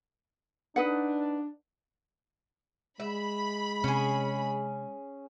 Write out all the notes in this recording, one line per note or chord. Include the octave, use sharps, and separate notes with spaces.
D4 D#4 B4 F#5
G#3 E5 B5
C3 C#4 G#4